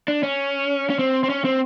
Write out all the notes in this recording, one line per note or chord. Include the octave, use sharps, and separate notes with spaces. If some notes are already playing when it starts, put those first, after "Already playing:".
D4
C#4
C#4
C4
C4
C#4
C4